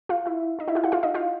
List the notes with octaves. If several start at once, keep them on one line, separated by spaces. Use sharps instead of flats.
F4 F5
E4 E5
D#4 D#5
E4 E5
F4 F5
F#4 F#5
F4 F5
D#4 D#5
F4 F5